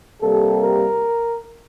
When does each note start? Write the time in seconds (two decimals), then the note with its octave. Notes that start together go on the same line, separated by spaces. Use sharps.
0.21 C3 G3 A#3 A4
0.61 A#4